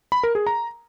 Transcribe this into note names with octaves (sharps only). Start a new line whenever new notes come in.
B5
A#4
G#4
A#5